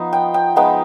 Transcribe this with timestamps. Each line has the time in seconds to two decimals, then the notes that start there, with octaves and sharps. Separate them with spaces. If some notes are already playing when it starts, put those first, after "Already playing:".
Already playing: F3 B3 D#4
0.13 G5
0.34 G5
0.56 F3 G#3 B3 D#4 G5